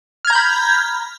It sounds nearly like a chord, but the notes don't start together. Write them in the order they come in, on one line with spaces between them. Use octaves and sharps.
F6 G#6 A#5 G6 B5